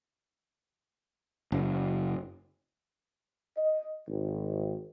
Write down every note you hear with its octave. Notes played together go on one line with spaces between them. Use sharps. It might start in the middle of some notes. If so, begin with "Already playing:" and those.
F#1
D#5
G#1